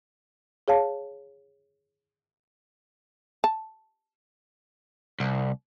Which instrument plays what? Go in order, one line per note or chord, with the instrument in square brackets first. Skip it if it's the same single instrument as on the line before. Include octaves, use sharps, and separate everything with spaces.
[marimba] G#4 C#5 F5 A5
[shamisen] A5
[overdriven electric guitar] C2